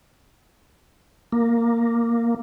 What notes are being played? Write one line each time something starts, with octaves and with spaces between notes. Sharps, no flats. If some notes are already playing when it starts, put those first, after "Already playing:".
A#3